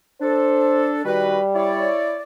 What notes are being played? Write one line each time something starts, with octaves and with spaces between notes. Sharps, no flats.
D4 A4 C5
D#3 G3 F#4 B4
E4 C#5 D5